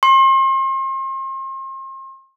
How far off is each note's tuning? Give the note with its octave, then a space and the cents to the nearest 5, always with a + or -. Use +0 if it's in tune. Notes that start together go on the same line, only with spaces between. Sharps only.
C6 +40